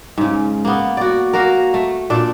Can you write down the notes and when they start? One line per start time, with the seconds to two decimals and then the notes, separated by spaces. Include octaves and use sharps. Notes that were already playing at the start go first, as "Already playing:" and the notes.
0.18 G#2 C#3
0.65 A#3 B3
0.97 F#4 D5
1.33 A#3 F#4 A#4
1.74 A3
2.10 A#2 D4 D5